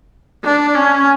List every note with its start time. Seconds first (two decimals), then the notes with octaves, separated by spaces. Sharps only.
0.44 D4
0.74 C#4